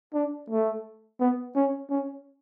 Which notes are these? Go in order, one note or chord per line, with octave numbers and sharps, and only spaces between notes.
D4
A3
B3
C#4
C#4